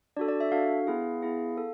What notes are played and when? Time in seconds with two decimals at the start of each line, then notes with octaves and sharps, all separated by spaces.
0.17 D4 F#4 A4 D5
0.28 D5
0.40 E5
0.52 D4 F#4 A4 F5
0.87 B3 E4 G#4
1.22 B3 E4 G#4
1.57 A4